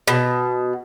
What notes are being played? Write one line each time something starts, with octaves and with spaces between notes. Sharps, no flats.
B2